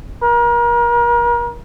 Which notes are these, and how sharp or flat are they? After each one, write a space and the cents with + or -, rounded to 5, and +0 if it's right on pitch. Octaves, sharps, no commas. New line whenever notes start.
A#4 +35